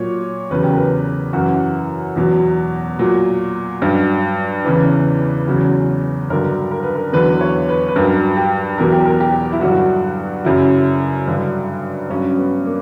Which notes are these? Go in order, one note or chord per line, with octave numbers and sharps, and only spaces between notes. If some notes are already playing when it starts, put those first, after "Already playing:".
Already playing: A#2 F#3 C#5
E2 C#3 F#3 B4
G4
A#4
B4
F#2 E3 F#4
E2 B2 F#3
A#2 F#3
G2 F#3
E2 C#3 E3 B4
E2 C#3 F#3
G2 D3 F#3 A#4
A#4
B4
A#4
E2 D3 F#3 B4
C#5
B4
B4
G2 F#3 A#4
G4
E2 B2 F#3 A#4
G4
A#4
G4
E4
G2 D3 F#3 F#4
F#2 C#3 F#3 E4
G2 D3 F#3
G2 F#3 C#4
B3
A#3